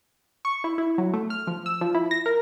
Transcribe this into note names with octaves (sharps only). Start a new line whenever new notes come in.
C#6
E4
E4
F#3
A3
F6
F3
E6
F3
E4
A#6
A#4